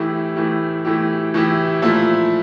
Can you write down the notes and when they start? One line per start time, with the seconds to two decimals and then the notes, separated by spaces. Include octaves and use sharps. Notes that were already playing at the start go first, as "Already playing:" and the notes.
Already playing: A2 E3 A3 E4 G4
0.36 A2 E3 A3 E4 G4
0.85 A2 E3 A3 E4 G4
1.34 A2 E3 A3 E4 G4
1.82 A#2 F3 A3 E4